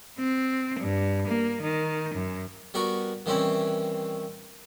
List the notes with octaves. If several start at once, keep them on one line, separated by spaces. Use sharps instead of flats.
C4
G2
A#3
D#3
F#2
G3 B3 F#4 A#4 C#6
D#3 E3 G3 C4 C#4 E4